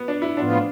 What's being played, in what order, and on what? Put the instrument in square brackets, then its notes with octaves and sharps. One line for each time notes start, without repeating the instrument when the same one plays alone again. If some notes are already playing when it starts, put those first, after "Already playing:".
Already playing: [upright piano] B3
D4
E4
[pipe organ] A2 F3 B3 F4 [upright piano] D4